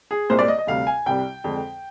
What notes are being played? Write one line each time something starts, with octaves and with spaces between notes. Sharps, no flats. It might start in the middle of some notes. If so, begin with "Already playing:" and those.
G#4
C2 A#2 G#3 C5
D5
D#5
D#5
D2 C3 G3 F5
G#5
C2 C3 G3 G5
F2 D3 G#3